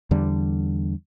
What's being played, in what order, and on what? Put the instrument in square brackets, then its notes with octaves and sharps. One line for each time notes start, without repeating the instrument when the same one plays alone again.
[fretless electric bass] E2 D3 G3